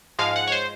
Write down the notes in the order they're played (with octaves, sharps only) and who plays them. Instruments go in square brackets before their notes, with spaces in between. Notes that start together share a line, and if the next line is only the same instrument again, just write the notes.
[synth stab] G#2 F3 G#3 F5
F#5
C#5
C5